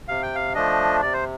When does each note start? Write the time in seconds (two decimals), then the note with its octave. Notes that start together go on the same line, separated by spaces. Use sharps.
0.08 C3 F5
0.22 G5
0.35 F5
0.55 F3 A3 D4 D#5
1.02 C3 D5
1.13 C5